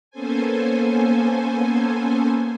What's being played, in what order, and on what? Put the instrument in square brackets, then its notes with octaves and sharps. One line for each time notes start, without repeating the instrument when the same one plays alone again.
[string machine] A#3 B3 C#4 A4 C5 G#5